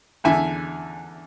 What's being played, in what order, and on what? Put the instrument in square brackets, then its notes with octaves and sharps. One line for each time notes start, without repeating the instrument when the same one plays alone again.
[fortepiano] E2 D3 E5 G#5